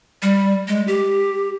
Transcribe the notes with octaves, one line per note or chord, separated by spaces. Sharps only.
G3
G#3
G4